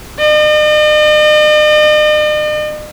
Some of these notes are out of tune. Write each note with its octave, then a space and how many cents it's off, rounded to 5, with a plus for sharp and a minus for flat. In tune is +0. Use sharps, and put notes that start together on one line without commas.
D#5 -45